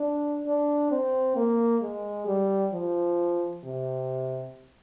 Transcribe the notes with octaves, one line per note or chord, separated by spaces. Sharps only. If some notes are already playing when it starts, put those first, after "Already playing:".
Already playing: D4
D4
C4
A#3
G#3
G3
F3
C3